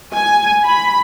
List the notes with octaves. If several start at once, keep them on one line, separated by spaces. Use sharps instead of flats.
G#5
B5